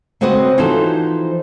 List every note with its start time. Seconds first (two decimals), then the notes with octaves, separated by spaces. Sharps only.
0.21 C#3 C4 F#4 B4 C5 D#5
0.58 E3 F3 D#4 F#4 A4 C5